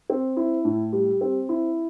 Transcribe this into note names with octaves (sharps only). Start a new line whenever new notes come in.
C4
E4
A2
G3
C4
E4